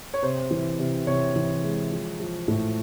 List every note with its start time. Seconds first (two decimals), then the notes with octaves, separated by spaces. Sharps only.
0.14 C#5
0.23 C3 C5
0.51 E3
0.79 C3
1.07 C3 C#5
1.36 E3
1.63 G#3
1.91 F3
2.20 F3
2.48 A2